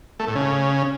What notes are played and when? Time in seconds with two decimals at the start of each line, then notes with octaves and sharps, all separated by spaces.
0.19 A3
0.27 A2
0.35 C#3